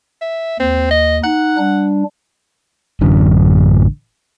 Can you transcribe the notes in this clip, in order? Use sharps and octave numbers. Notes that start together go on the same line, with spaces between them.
E5
D#2 C4
D#5
D#4 F#5 F#6
G3 D4
A1 F#2 D3